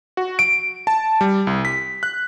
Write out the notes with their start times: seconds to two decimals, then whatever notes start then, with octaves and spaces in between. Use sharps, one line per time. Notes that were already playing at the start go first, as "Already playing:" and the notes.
0.17 F#4
0.39 D7
0.87 A5
1.21 G3
1.47 C2
1.65 B6
2.03 F#6